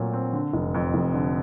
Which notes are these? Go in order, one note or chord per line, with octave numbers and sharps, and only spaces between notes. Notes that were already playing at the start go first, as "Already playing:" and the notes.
Already playing: A#2 F#3 A3 C4
C4
D3
F1
F2
F1
D3